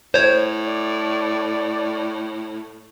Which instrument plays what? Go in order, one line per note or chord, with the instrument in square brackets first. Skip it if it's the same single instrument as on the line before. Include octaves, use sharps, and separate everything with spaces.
[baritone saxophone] A2 [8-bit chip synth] C5 C#5
[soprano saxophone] D5